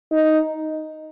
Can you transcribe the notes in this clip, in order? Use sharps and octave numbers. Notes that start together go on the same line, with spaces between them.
D#4